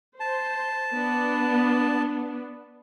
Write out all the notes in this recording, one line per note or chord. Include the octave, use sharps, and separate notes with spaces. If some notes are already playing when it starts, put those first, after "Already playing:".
C5 A5
B3 D4